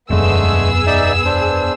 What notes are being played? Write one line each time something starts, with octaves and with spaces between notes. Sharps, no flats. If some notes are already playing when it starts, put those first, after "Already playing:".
E1 F#2 D3 G#3 A3 B3 G#4 E6
D#4 D5 E5
D4 C5